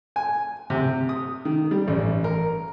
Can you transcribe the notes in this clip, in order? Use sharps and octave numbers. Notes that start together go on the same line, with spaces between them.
G#5
C3
D#6
D#3
G3
A1
A#4